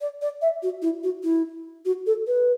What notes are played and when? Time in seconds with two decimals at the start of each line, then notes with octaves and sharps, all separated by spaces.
0.01 D5
0.21 D5
0.41 E5
0.62 F#4
0.82 E4
1.03 F#4
1.23 E4
1.85 F#4
2.06 A4
2.27 B4